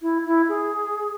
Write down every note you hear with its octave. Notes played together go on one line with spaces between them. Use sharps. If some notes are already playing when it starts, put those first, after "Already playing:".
E4
E4
G#4